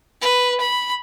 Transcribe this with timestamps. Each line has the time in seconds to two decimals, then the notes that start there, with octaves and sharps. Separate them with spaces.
0.21 B4
0.61 B5